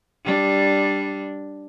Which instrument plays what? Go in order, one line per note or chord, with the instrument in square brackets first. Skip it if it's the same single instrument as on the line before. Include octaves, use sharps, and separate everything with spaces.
[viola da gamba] G3 D4